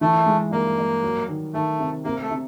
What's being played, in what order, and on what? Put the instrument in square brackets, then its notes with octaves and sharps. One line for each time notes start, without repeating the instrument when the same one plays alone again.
[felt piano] E3 [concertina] A3
[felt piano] G#3
[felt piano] G2 [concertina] A#3
[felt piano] G2
F#3
D#3
[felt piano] D#3 [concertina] A3
[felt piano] C3
[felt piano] C3 [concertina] A#3
[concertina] A3
[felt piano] C3